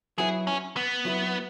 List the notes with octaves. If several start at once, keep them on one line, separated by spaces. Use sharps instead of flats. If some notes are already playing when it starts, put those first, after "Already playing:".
F#3 E4 G#4 B4
C#4
B3
F#3 E4 B4